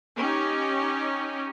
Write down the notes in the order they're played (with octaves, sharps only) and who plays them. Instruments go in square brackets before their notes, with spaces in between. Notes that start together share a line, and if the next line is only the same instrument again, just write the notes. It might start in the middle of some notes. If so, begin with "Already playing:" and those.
[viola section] C#4 D#4 G4